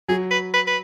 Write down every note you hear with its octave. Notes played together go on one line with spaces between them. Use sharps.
F#3 G#4
B4
B4
B4